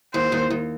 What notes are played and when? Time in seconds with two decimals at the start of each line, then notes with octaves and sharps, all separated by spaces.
0.14 D#2 C5
0.32 D#2
0.50 D#2